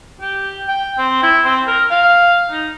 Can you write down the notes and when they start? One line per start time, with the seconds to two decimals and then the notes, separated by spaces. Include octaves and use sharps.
0.21 G4
0.68 G5
0.98 C4
1.23 E4
1.45 C4
1.68 A#4
1.91 F5
2.51 D#4